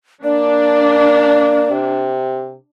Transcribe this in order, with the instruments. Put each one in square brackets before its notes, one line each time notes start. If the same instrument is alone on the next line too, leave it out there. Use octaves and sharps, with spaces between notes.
[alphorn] A#3 [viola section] D4 [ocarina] D5
[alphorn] C3